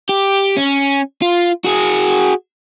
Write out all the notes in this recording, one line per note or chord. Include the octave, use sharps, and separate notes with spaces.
G4
C#4
F4
F#4 G#4